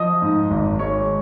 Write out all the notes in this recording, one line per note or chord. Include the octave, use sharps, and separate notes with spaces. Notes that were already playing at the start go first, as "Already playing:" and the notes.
Already playing: F3 D#5 D#6
G#2
G#1
G#3 C#5 C#6